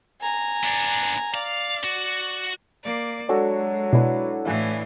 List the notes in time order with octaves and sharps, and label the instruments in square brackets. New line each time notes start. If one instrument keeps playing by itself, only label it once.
[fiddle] G#5 A#5
[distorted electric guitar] B3 D4
[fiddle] D5 [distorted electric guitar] F5
[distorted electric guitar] F#4
[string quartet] A#3 D5
[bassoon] F#3 [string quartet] G#3 [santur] D4 F#4 A4
[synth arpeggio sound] B2 [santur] D4 E4 B4
[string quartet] A2 E3 [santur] F5 G#5